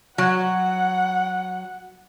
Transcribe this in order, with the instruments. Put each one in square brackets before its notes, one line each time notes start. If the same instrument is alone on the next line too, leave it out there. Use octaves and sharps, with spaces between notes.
[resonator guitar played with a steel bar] F#3 [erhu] F#5